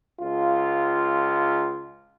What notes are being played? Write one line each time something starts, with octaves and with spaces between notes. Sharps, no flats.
C#2 F4